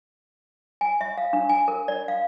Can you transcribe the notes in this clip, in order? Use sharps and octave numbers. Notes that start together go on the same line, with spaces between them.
G#5
E5
F5
D4
G#5
A#4
D5
F5